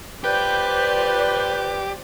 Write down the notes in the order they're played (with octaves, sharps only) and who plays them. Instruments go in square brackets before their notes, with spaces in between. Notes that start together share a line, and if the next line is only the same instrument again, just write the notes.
[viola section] F4 C5 D5 [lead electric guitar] G4 [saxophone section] B4 [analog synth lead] G6